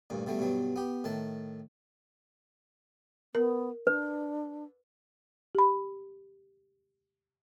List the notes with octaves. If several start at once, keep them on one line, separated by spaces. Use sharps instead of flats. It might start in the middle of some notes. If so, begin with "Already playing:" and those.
D2 G2 A#2
B2 D3 G3 A3
G2 B2 F#3 G3
B3 G4
A2 D#3 A5
B3 A#4
D4 B4
G4 B5